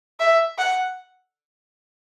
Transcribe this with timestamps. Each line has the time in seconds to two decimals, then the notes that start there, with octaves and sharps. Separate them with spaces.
0.20 E5
0.58 F#5